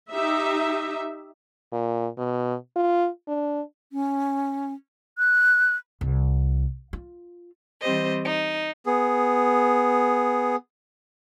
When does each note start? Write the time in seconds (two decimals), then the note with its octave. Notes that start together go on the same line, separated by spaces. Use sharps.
0.10 D#4 G4 E5
1.73 A#2
2.18 B2
2.76 F4
3.28 D4
3.92 C#4
5.18 F#6
6.01 C2
6.93 F4
7.81 E3 G3 C4 G4 C5 D#5
8.24 D#4
8.86 B3 G#4